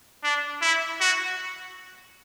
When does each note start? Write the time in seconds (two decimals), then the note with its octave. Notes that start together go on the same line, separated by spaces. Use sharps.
0.23 D4
0.61 E4
1.01 F#4